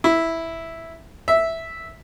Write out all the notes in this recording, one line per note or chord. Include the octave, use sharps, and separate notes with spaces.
E4
E5